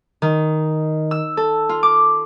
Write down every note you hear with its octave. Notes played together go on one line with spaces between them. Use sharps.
D#3
E6
A4
F4
D6